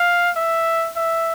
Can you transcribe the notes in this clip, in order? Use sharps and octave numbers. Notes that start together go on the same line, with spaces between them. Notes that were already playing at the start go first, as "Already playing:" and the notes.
Already playing: F5
E5
E5